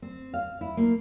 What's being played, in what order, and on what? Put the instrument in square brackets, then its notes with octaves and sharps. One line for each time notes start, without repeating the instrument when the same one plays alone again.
[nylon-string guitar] C4
F5
E4
A#3